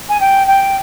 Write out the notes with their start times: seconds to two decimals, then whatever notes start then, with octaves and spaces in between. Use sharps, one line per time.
0.08 G#5
0.19 G5
0.47 G5